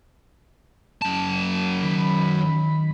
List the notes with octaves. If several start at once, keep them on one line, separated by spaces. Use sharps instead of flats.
F#2 A5
D#3 B5